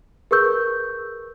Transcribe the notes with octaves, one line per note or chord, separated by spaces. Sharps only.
G#4 A#4 B4 C#6 E6 G6